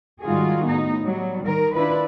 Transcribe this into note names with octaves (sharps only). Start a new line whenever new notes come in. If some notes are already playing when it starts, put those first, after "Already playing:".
G#2 D#3 G3 F4 F#4 G#4
A2 B3 D#4
F#3 G3
D#3 A#4
D4 E4 F4 B4